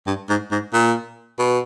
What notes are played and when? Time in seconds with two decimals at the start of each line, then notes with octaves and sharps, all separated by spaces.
0.07 G2
0.29 G#2
0.51 G#2
0.74 A#2
1.39 B2